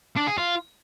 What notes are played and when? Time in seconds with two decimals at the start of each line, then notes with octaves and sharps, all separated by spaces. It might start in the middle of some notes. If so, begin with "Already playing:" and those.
0.16 D4
0.27 G#4
0.38 F4